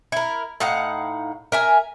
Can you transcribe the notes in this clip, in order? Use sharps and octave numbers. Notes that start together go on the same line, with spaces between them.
E4 A#4
A2 D#4 F5 F#5
A#4 E5 G#5